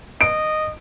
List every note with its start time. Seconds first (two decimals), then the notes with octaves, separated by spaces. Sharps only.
0.21 D#5 D7